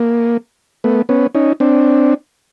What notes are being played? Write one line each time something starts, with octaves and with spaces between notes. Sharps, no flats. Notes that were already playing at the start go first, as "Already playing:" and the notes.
Already playing: A#3
A3 B3
B3 C#4
C#4 D#4
C4 D4